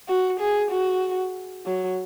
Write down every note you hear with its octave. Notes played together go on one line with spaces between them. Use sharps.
F#4
G#4
F#4
F#3